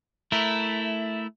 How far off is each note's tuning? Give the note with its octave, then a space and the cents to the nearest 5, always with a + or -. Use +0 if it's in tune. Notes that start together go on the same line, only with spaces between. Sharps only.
A3 +0 E4 +0 A#4 +5